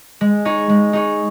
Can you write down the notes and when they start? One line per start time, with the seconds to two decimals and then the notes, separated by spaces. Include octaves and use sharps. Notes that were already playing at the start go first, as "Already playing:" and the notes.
0.21 G#3
0.45 D#4 G#4 C#5
0.69 G#3
0.93 D#4 G#4 C#5